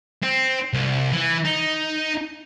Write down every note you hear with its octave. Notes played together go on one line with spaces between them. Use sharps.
C4
C2
E3
D#4